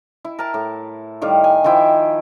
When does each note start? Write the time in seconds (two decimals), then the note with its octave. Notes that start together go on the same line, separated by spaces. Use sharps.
0.25 E4
0.39 A#4 A5
0.54 A2
1.22 A2 D#3 G3 F5
1.44 G#5
1.64 D#3 F3 E4 G5